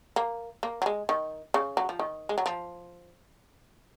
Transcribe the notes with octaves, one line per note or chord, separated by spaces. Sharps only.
A#3
A#3
F#3
G#3
D#3
C#3
F#3
F3
D#3
G#3
F#3
F3